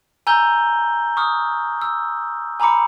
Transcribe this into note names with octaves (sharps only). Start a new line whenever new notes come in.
G#5 A#5 E6 G6 G7
C#6 D#6 F6
E6
G#5 A#5 B5 D6 C#7